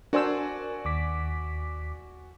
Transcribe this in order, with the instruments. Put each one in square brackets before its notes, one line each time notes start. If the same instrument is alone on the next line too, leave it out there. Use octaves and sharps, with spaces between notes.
[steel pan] D4 C5 E6 [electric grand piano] F#4 D5 G#5 [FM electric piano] A#4
[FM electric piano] D#2 D6 B6